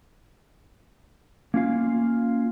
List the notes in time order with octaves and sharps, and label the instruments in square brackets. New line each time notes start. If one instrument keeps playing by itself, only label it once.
[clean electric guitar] A#3 C#4 F4 F5